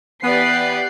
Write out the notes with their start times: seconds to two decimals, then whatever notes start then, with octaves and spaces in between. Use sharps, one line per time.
0.23 E3 B3 G4 B4 D5 C7